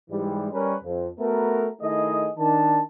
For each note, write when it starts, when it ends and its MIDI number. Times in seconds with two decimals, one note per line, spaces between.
0.10 0.48 44
0.10 0.48 52
0.10 0.48 55
0.10 0.48 56
0.52 0.76 55
0.52 0.76 61
0.52 0.76 70
0.52 0.76 71
0.84 1.07 41
1.20 1.68 57
1.20 1.68 59
1.20 1.68 66
1.20 1.68 70
1.82 2.30 51
1.82 2.30 57
1.82 2.30 64
1.82 2.30 68
1.82 2.30 75
2.38 2.80 51
2.38 2.80 62
2.38 2.80 81